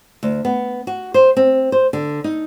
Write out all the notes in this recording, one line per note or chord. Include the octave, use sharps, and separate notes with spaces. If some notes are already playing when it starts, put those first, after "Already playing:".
D2
B3
F#4
C5
C4
C5
D3
D#4